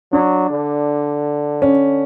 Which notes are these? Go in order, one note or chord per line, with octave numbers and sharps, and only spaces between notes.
F#3 D4
D3
C#4